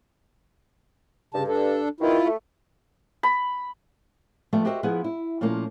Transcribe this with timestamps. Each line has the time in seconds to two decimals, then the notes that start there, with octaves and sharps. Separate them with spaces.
1.34 G2 C#3 A5
1.48 D4 A4
2.00 E2 B2 D#3 E4 F4
2.25 A3
3.23 B5
4.53 F3 G3 A3 B3 E5 A5
4.65 F#4 G4 A#4 C5 D#5 E5
4.83 F3 B3 E4 G#4 B4
5.04 E4
5.41 A#2 F3 A3 A#3 C#4